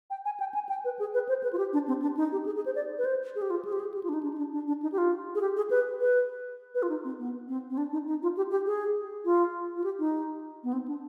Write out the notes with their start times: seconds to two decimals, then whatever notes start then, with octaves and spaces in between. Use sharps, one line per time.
0.10 G5
0.25 G#5
0.40 G5
0.54 G#5
0.69 G5
0.85 B4
0.99 G#4
1.14 B4
1.29 C5
1.43 B4
1.53 F4
1.58 G4
1.73 D4
1.88 C4
2.02 D4
2.17 D#4
2.32 G4
2.46 G#4
2.56 G#4
2.66 C5
2.75 D5
2.98 B4
3.05 C5
3.35 G#4
3.42 G4
3.50 F4
3.65 G#4
3.73 G4
3.80 G#4
3.94 G4
4.03 F4
4.09 D4
4.14 D#4
4.23 D4
4.34 D#4
4.38 D4
4.53 D4
4.68 D4
4.83 D#4
4.92 G4
4.98 F4
5.35 G#4
5.41 G4
5.57 G#4
5.71 B4
6.01 B4
6.75 B4
6.83 F4
6.89 D#4
7.04 C4
7.19 B3
7.48 C4
7.70 C4
7.78 D4
7.93 D#4
8.07 D#4
8.23 F4
8.37 G4
8.51 G4
8.66 G#4
9.25 F4
9.76 F4
9.84 G4
9.99 D#4
10.64 B3
10.73 C4
10.88 D4